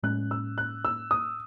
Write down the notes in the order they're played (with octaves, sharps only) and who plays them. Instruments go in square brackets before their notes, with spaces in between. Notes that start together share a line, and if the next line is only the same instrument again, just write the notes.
[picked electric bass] A2 G#3 C#4 [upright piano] F#6
[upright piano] E6
F#6
E6
D#6